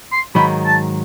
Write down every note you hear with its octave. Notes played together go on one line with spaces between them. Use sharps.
C6
G#2 D#3 F#3 B5
A5